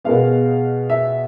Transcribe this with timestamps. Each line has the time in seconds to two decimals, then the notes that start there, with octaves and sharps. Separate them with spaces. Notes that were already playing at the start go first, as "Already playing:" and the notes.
0.04 B2 G#3 B3 F5
0.90 E5